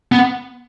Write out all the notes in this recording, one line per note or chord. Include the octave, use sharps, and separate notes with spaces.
B3